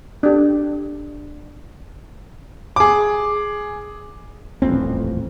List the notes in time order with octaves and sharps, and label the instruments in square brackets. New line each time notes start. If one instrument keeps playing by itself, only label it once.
[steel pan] D4 G4
[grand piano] G#4 D6
[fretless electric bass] D#1 A1 F2 C4